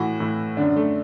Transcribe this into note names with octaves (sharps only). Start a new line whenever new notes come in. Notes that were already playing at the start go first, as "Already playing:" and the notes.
Already playing: A2 E3 F#4
A2 E3
F#2 D3 D4
A3